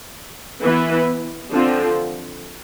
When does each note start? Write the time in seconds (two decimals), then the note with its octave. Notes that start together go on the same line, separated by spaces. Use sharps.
0.63 E3 B3 E4 B4
1.51 D3 F3 C4